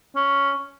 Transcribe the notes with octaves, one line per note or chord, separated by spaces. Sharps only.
C#4